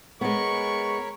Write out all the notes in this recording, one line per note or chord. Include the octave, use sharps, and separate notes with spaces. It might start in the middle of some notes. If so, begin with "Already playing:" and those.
G#3 B3 A#4 C#5 B5 C#6